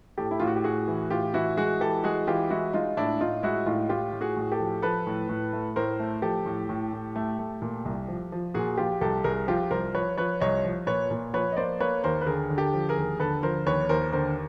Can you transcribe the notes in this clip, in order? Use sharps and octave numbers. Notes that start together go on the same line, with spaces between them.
A2 G4 A4
E4
A2 F4
F#4
G4
A2 F#4 G#4
E3
A2 F4 G4
E3 E4 F#4
G#3 F#4 G#4
E3 G4 A4
G#3 F#4 G#4
E3 F4 G4
G#3 E4 F#4
G#3 D#4 F4
A2 D4 E4
A2 D#4 F4
G#3 E4 F#4
A2 D#4 F4
A2 F4 G4
A2
F#4 G#4
A2
G4 A4
F3
F3 A4 B4
A2
A2
A3
A2 A#4 C5
A3
F3 G4 A4
A2
A2
A2
A3
A3
A#2
C2
F3
F3
A#2 F#4 G#4
F3 F4 G4
C2 G4 A4
C2 G#4 A#4
F3 F4 G4
C2 A#4 C5
F3 B4 C#5
F3 B4 C#5
C2 C#5 D#5
F3
A#2 B4 C#5
A#2
F3 B4 C#5
D#5
A#3 C5 D5
A#3 B4 C#5
D#2 A#4 C5
B4
D3 G#4 A#4
D3
G4 A4
F3
G#4 A#4
D#2
D3 A4 B4
F3 A#4 C5
D#2 B4 C#5
D#2 A#4 C5
D3 A#4 C5